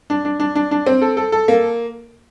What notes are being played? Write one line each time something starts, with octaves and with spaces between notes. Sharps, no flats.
D4
D4
D4
D4
D4
C4
A4
A4
A4
A#3